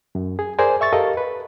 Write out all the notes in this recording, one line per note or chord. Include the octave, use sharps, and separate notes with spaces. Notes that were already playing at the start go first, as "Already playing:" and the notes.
F#2
G#4
G#4 A#4 C5 D5 G#5
E5 C#6 A6
G4 A4 A#4 D#5 F5
B4